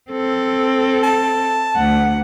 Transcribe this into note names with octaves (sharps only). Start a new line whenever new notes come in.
C4 A4
A5
D2 F#5